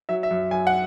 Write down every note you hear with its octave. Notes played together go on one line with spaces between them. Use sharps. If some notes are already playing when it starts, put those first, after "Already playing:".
F#3 E5
E5
F#2
F#2 G#5
F#5